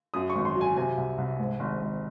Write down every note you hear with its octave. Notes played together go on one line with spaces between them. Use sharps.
F#2 D#6
C#6
G#1
C6
F#3
G#5
C3 G#5
C2
C2
G#2
G#1
G#1